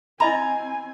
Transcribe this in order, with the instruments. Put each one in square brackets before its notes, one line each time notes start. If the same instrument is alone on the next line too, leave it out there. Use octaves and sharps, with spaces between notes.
[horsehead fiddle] C4 G#5 [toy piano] E4 D#5 B5 [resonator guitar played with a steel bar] A#5